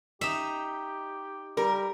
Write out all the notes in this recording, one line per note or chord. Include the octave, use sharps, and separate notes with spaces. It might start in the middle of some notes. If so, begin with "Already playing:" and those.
D#4 G4 E5
G3 A#4